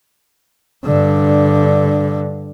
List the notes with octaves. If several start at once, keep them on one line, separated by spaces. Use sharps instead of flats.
G2 D3